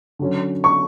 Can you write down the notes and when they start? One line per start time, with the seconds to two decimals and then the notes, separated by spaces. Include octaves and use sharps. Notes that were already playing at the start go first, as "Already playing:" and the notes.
0.19 D3 F#3 C#4
0.64 C#6